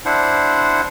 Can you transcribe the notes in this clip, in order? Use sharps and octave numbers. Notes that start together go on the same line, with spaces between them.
D4 E4 C5 F#5